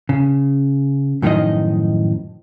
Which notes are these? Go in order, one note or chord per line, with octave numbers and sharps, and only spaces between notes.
C#3
F#2 A2 D#3 F3 D#4 D#5